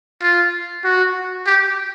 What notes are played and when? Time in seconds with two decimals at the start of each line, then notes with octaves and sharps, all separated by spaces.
0.22 F4
0.84 F#4
1.46 G4